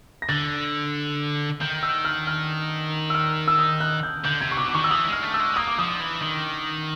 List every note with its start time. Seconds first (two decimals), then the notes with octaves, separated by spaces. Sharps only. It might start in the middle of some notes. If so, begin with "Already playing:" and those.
0.22 A#6
0.29 D3 A6
1.61 D#3 G6
1.83 E6
2.05 F6
2.27 F6
3.10 E6
3.14 F6
3.48 E6
3.59 D#6
3.80 F#6
4.03 G6
4.24 D3 G6
4.41 C3 G#6
4.52 C#6
4.57 B2 D6
4.68 D6
4.74 D#3 C#6
4.84 E6
4.91 E3 D#6
5.07 G#3
5.12 F6
5.23 A3
5.34 E6
5.40 G#3
5.56 A#3 D#6
5.68 D6
5.79 F3 D#6
6.00 E3
6.22 D#3